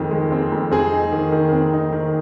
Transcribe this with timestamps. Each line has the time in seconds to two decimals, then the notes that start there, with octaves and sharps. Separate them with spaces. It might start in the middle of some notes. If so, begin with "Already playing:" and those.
Already playing: F2 D#3 G#3
0.11 G#3
0.32 C4
0.52 F2
0.71 C4 G#4
0.92 D#4
1.12 D#3
1.32 D#3
1.53 C4
1.73 D#4
1.93 D#3